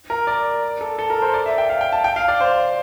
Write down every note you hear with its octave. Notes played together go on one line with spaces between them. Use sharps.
A#4
D5
A4
A4
A#4
C5
D5
E5
G5
F5
G5
A5
G5
F5
D5
C5